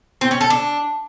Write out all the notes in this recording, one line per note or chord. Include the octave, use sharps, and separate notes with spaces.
C4
C#4
A4
D4